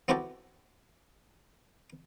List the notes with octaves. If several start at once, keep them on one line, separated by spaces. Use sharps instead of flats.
B3 C4 E4 F#4 G4 A4